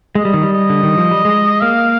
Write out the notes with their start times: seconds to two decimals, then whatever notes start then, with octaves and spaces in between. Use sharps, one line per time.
0.15 G#3 D#5
0.25 G3
0.34 D#3
0.43 G3
0.53 D#5
0.70 D3
0.83 D#3
0.97 F3
1.11 G3
1.25 G#3
1.61 A#3 F5